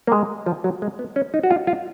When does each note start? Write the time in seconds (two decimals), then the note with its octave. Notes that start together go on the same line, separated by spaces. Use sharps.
0.07 A#3
0.12 G#3
0.46 F3
0.64 F#3
0.82 G#3
0.99 B3
1.16 C#4
1.34 D#4
1.43 F#4
1.51 F4
1.67 F4